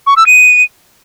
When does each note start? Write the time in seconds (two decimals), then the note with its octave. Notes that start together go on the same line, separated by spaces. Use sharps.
0.07 C#6
0.17 E6
0.26 D#7